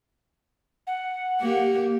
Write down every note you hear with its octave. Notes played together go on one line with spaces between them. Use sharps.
F#5
A#3 G4